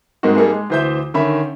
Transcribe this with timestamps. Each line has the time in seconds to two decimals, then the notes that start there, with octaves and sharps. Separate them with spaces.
0.23 G#2 G#3 A#3 C4 D#4 F#4
0.36 G3 A#3 D#4 G#4 A4
0.52 G#3
0.70 D2 E3 C5 E5 G6
1.14 D3 D#3 C#4 E5 B5